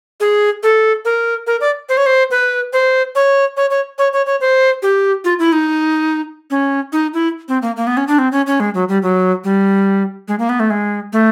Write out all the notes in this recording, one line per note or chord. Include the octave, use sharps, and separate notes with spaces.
G#4
A4
A#4
A#4
D5
C5
C#5
C5
B4
C5
C#5
C#5
C#5
C#5
C#5
C#5
C5
G4
F4
E4
D#4
C#4
D#4
E4
C4
A#3
A#3
B3
C#4
D4
C4
C#4
C#4
G#3
F#3
G3
F#3
G3
G#3
A#3
B3
A3
G#3
A3